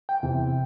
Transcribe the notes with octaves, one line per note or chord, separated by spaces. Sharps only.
G5
E2 C3 E3